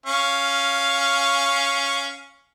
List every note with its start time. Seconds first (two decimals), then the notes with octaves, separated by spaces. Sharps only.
0.06 C#4 F5